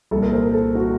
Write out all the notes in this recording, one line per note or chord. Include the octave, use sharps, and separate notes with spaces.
C2 A#2 A4
A#4
C5
A4
F#4